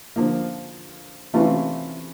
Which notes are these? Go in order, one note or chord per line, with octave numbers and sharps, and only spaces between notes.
D3 F3 A#3
C3 E3 A3 C#4 F4